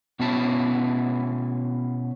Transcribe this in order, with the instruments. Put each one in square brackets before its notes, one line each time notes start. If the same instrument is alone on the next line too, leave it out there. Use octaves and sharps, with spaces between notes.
[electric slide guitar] B2 B3 C#4 E4 F#4 A5